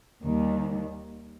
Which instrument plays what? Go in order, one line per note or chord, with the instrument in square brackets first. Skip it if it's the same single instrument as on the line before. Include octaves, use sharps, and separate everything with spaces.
[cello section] D#2 D#3 G3